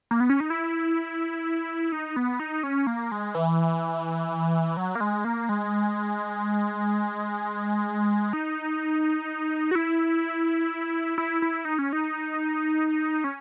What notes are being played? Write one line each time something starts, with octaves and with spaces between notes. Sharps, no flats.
A#3
B3
C#4
D#4
E4
D#4
B3
D#4
C#4
A#3
G#3
E3
F#3
A#3
G#3
A#3
G#3
D#4
F#4
E4
E4
E4
D#4
C#4
D#4
C#4